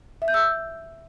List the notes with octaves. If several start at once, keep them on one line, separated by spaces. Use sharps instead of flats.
E5
G6
E6